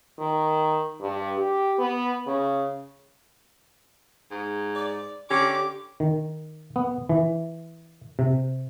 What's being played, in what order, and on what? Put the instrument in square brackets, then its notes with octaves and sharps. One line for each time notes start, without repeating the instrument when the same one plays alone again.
[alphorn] D#3
G2
G4
B3
C#3
[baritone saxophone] G#2
[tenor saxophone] D5
[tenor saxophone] D3 [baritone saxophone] C#4 [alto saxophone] G4 [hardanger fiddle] D6
[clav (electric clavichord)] D#3
B3
E3
C3